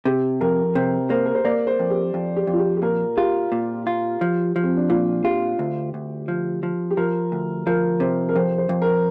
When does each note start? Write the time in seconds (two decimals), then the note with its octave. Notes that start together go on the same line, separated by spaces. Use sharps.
0.05 C3 G4
0.41 F2 A#4
0.75 C3 C5
1.10 A#3 C5
1.26 A#4
1.35 C5
1.45 A#3 D5
1.67 C5
1.79 F2
1.90 G4
2.14 F2
2.36 G4
2.47 F2
2.53 F4
2.59 G4
2.77 G4
2.82 A#2 A#4
3.17 F4 G4
3.52 A#2
3.87 F4
4.21 F3
4.56 F3
4.63 C4
4.77 D4
4.90 A#2 F4
5.24 F4 G4
5.59 D2
5.94 D2
6.28 F3
6.63 F3
6.91 G4
6.97 F3 A#4
7.32 D2
7.66 F3 A#4
8.00 C3 C5
8.29 A#4
8.36 F2 C5
8.58 C5
8.69 F2
8.82 A#4